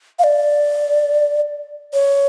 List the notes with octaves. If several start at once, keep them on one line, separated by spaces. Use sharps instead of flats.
F5
D5
C#5